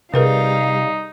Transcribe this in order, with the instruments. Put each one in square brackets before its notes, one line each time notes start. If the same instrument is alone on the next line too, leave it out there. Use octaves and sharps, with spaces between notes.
[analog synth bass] C3 [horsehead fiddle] G3 F5 [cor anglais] D#4 [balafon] G#4 A#4 B4